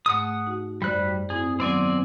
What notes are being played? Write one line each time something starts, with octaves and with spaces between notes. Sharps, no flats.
G#2 A3 F#5 D#6
D#4 F#4
F#2 G3 C5 D5 F#6
C4 E4 G#4
D#3 F#3 B3 C4 D5 G#5